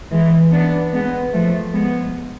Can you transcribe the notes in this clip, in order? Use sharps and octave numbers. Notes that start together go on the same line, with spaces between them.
E3 G#3
B3 D4
G#3 B3
F3 A3
G#3 B3